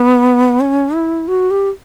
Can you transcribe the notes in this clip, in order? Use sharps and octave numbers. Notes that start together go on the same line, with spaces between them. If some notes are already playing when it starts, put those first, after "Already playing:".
Already playing: B3
C#4
E4
F#4
G4